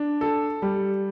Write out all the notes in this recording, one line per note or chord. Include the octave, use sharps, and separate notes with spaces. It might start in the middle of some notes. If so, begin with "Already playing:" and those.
Already playing: D4
A4
G3